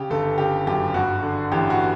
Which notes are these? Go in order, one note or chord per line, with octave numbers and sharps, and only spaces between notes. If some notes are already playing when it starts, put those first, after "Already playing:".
Already playing: C#3 G4
G1 A4
C#3 G4
F#2 G4
G2 F#4
D3
A1 G4
F#4